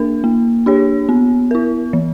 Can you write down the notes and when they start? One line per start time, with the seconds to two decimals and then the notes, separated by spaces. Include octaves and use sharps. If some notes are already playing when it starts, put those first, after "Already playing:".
Already playing: A#3 D4 A#4
0.24 A#3
0.66 D4 G4 C#5
1.09 B3
1.51 E4 A#4
1.93 E3